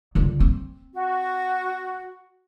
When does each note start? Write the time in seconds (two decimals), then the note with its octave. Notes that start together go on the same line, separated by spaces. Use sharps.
0.15 C#2 D3
0.40 C4
0.94 F#4